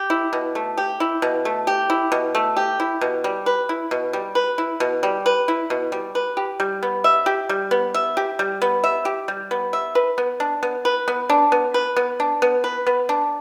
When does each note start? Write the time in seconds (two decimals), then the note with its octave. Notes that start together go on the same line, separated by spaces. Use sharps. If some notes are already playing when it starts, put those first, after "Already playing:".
Already playing: G4
0.10 E4
0.33 B2
0.55 A3
0.78 G4
1.00 E4
1.22 B2
1.45 A3
1.67 G4
1.90 E4
2.12 B2
2.35 A3
2.57 G4
2.80 E4
3.01 B2
3.24 G3
3.46 B4
3.69 E4
3.91 B2
4.13 G3
4.35 B4
4.58 E4
4.80 B2
5.03 G3
5.26 B4
5.48 E4
5.70 B2
5.92 G3
6.15 B4
6.37 G4
6.60 G3
6.83 B3
7.04 E5
7.26 G4
7.49 G3
7.71 B3
7.94 E5
8.17 G4
8.39 G3
8.62 B3
8.84 E5
9.05 G4
9.28 G3
9.51 B3
9.73 E5
9.95 B4
10.18 B3
10.40 D4
10.63 B3
10.85 B4
11.08 B3
11.30 D4
11.52 B3
11.74 B4
11.96 B3
12.20 D4
12.42 B3
12.64 B4
12.87 B3
13.09 D4